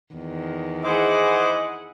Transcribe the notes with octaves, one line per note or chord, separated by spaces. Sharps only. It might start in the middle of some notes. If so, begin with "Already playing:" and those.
E2 D#3
E4 G#4 C5 D#5 F#5 D6